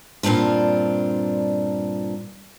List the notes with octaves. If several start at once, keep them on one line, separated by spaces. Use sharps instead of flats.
G2 A#2 C4 D4 F4